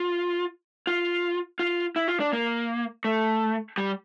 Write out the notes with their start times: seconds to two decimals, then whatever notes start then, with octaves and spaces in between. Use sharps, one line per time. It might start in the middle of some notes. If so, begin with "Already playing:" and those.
Already playing: F4
0.87 F4
1.59 F4
1.96 E4
2.08 F4
2.20 D4
2.33 A#3
3.05 A3
3.78 G3